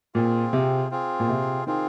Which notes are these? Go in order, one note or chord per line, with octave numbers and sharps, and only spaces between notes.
A#2 C4 F4 G#4
C3
C4 F4 G#4
A#2
C3
D#3 C4 F4 G#4